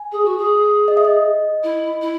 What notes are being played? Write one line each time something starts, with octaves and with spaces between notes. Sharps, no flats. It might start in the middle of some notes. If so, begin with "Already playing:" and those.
Already playing: G#5
G#4
F#4
G#4
D#5
E5
D#5
E4
E4